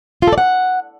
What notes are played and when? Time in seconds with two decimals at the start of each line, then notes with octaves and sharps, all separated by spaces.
0.22 F4
0.27 A4
0.33 D5
0.38 F#5